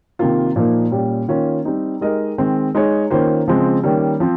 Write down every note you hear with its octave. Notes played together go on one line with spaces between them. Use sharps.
C3 D#3 A#3 F4
A#2 F3 A#3 D#4
A#2 G3 C#4 G4
D#3 A#3 C#4 F4
G3 C4 D#4
G#3 D#4 G4 A#4 D#5
D#3 G#3 C4
G#3 D#4 G#4 C#5
D#3 A#3 C#4 F4 C5
C#3 F3 G#3 C4
D#3 G3 A#3 C#4
F3 C4